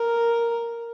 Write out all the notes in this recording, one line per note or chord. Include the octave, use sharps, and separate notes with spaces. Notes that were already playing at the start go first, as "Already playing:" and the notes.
Already playing: A#4